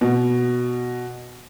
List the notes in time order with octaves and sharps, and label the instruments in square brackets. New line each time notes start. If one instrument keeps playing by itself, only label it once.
[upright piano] B2